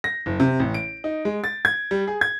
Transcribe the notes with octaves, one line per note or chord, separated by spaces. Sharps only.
A#6
F#1
C3
A1
D7
D#4
G#3
A6
G#6
G3
G#4
G#6